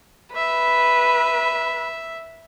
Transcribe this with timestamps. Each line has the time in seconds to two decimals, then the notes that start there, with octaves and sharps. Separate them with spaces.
0.36 B4 E5